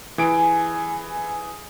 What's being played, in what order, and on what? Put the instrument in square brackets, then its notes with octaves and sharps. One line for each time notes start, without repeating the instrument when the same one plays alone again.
[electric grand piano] E3 D7 [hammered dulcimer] G#4